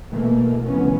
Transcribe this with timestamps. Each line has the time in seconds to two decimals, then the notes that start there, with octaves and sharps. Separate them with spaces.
0.11 B2 E3 A3 A#3
0.66 F1 D2 E3 B3 C#4